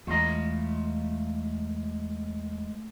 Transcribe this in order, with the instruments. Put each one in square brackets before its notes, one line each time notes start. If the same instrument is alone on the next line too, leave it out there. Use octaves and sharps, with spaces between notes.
[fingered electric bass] E2 [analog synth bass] G#3 [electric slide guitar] A3 A#5 [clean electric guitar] F4 D#5